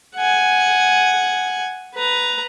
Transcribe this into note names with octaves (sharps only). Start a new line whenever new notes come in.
F#5 G#5
B4 A#5